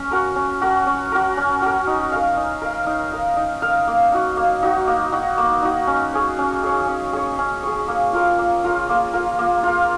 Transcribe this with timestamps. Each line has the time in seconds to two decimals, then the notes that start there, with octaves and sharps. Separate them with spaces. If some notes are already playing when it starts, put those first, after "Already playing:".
Already playing: C#4
0.11 F#4 A#4
0.36 C#4
0.61 F#4 A#4
0.87 C#4
1.12 F#4 A#4
1.37 C#4
1.62 F#4 A#4
1.87 D#4
2.12 A#4 F5
2.37 D#4
2.62 A#4 F5
2.87 D#4
3.12 A#4 F5
3.37 D#4
3.62 A#4 F5
3.88 A#3
4.12 D#4 F#4
4.37 A#3
4.63 D#4 F#4
4.87 A#3
5.12 D#4 F#4
5.38 A#3
5.62 D#4 F#4
5.87 C#4
6.13 G#4 C#5
6.39 C#4
6.63 G#4 C#5
6.88 C#4
7.13 G#4 C#5
7.39 C#4
7.63 G#4 C#5
7.88 A#3
8.13 F4 A#4
8.39 A#3
8.64 F4 A#4
8.89 A#3
9.13 F4 A#4
9.39 A#3
9.63 F4 A#4